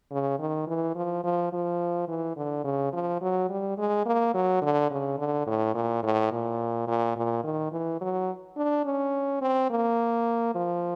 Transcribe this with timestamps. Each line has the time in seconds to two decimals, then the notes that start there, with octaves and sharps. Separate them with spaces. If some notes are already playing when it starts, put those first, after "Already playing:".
0.11 C#3
0.39 D#3
0.68 E3
0.95 F3
1.24 F3
1.53 F3
2.08 E3
2.37 D3
2.64 C#3
2.93 F3
3.21 F#3
3.49 G3
3.78 G#3
4.06 A#3
4.34 F#3
4.62 D3
4.91 C#3
5.18 D3
5.47 A2
5.75 A#2
6.03 A2
6.32 A#2
6.88 A#2
7.16 A#2
7.44 D#3
7.73 E3
8.01 F#3
8.57 D4
8.85 C#4
9.42 C4
9.70 A#3
10.55 F3